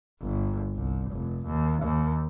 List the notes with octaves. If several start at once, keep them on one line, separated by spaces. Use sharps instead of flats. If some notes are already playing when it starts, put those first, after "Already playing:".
G1
C2
F1
D#2
D#2